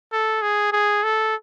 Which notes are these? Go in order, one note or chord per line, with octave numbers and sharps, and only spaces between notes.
A4
G#4
G#4
A4